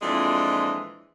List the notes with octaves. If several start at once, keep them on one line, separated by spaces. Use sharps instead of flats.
F2 A#2 E3 G#3 D4